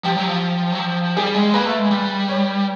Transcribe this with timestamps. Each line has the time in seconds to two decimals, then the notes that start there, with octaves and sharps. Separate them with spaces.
0.04 F3 G4
0.16 F#3
0.27 F3
0.72 F#3
0.80 F3
1.17 G3 G#4
1.35 G#3
1.54 A#3 B4
1.66 A3
1.79 G#3
1.91 G3
2.29 C#5